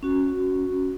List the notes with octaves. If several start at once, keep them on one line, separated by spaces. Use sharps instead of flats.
C#4 F#4